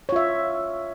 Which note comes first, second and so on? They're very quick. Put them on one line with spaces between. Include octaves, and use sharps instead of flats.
C#5 F4 E5